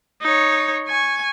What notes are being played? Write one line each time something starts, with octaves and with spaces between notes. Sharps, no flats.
D#4 C#5
G#5 C#6